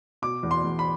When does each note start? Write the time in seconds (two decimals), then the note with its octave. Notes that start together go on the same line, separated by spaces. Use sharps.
0.22 B2 D6
0.43 E2
0.51 C6
0.64 E2
0.79 B5